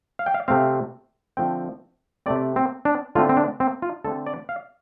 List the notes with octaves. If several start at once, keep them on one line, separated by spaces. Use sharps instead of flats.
F5
G5
F5
C3 A3 C4 F5
D3 F3 A3 C4 G5
C3 A3 C4 D5
C4
D4
D3 A3 C4 F4
C4
D4
C4
F4
D3 A3 C4 A4
D5
F5